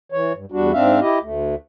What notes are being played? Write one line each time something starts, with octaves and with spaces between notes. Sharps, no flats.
E3 C#5
G2
E2 G3 D4 F#4
G#2 C4 D4 E5 F5
E4 G4 D#5
D2 A3